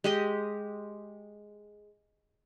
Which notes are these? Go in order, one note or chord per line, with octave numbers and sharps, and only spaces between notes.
G#3 G4 D#5